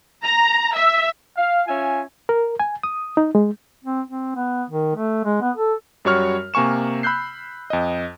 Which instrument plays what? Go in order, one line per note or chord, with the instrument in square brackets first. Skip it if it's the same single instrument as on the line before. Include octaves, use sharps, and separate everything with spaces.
[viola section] A#5
E5
[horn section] F5
C#4 F4 E5 G#5
[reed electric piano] A#4
G#5
D#6
D#4
G#3
[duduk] C4
C4
B3
D#3
A3
G#3
B3
A4
[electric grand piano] F#2 G3 F#4 C#5 C#6 F6
C3 A#3 G#5 C#6 E7
B5 E6 F#6 G6 C7
F2 D#5